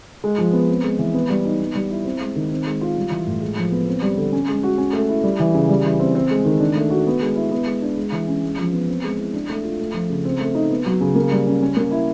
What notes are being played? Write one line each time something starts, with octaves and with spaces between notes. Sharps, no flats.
G#3
F3
B3
C4
G#3
E3
B3
G3
D#4
B3
G3
E4
C4
G#3
D#3
C4
G#3
F4
G3
E3
A2
G#3
F3
B3
C4
G3
D3
C#4
G#3
F#4
C#4
A3
E4
G3
E3
C#3
G3
E3
C4
C4
G#3
D#3
D4
A3
F#4
B3
G#3
E4
B3
G#3
D4
G#3
E3
C#4
G#3
F3
B3
C4
G#3
E4
D4
A3
F4
A3
F3
C#3
C4
A3
D#4
B3
F#3
C#3
A#3
G3
C#4
C#4
A#3
E4